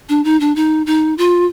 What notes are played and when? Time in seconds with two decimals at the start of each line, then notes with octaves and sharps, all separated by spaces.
0.09 D4
0.24 D#4
0.40 D4
0.56 D#4
0.86 D#4
1.18 F4